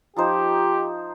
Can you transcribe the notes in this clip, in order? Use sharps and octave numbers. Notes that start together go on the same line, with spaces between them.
F3 D#4 G4 C5